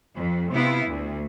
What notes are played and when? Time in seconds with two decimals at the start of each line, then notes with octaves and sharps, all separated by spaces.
0.16 F2
0.52 C3 B3 E4 F4
0.87 D2